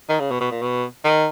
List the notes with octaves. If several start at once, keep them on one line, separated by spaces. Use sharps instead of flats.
D#3
C#3
B2
B2
A#2
B2
D#3